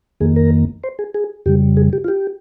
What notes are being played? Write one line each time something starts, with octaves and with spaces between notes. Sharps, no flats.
F2 D#3 A#3 G#4
A#4
C5
G#4
G#4
F2 C#3 G3 G4
G#4
G4
F4
G4